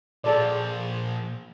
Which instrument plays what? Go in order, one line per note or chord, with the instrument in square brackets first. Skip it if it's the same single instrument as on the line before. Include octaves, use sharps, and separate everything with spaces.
[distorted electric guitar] A#2 F3 [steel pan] G#4 A4 D5